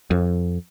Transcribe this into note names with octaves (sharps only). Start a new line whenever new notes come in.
F2